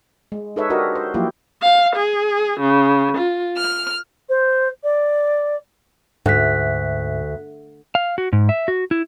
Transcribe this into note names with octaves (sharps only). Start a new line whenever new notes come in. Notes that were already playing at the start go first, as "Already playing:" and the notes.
G#3
D#4 G#4 A4 B4 C#5 E5
D4 F#4 G4 A#4 D#5
C5
F3 F#3 A#3 E4 F4 G4
F5
G#4
C#3
F4
F6
C5
D5
D2 G#2 E5 F#6 B6
F5
F#4
G#2
E5
F#4
E4